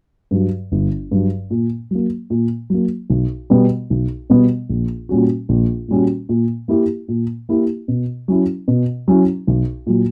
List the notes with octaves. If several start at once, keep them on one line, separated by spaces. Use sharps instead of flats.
G2 F#3
G1
G2 F#3
A#2
F#3 A#3
A#2
F#3 A#3
B1
B2 G3 B3
B1
B2 G3 B3
A#1
A#2 G3 C#4 F#4
A#1
A#2 G3 C#4 F#4
A#2
A#3 E4 G4
A#2
A#3 E4 G4
B2
F#3 C#4 E4
B2
F#3 C#4 E4
B1
A#2 F#3